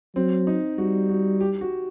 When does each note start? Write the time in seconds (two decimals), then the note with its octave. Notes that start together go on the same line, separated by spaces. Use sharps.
0.16 F#3 C4
0.47 D#4
0.78 G3 F#4
1.10 F#4
1.41 G4
1.61 F#4